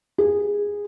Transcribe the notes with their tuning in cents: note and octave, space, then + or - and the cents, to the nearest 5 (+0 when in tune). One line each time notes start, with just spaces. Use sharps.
G#4 -15